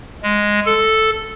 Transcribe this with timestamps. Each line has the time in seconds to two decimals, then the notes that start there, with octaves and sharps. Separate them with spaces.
0.23 G#3
0.66 A4